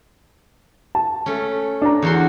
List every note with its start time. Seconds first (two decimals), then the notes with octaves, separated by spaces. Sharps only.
0.95 A5
1.26 A3 C#4
1.82 D4 A#5
2.02 E2 F#4 C6